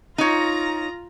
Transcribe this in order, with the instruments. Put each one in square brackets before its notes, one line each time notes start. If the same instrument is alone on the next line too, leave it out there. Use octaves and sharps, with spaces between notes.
[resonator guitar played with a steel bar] D#4 C#5 [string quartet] F4 A#5 A#6